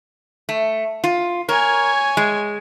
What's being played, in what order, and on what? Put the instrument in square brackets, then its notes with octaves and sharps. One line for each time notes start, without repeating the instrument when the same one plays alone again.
[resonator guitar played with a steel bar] A3
F4
[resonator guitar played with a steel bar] A#4 [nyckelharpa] C#5 G#5
[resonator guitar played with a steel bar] G#3